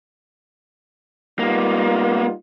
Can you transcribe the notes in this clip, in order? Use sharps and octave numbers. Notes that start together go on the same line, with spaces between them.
G3 A#3 B3 D#4 F4